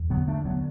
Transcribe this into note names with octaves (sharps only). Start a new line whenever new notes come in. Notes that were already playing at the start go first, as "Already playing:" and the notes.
Already playing: E2
D3 F#3 B3
A3 D4
D3 F#3 B3